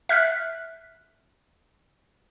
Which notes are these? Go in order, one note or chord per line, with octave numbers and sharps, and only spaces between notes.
E5 F6 F#6 B6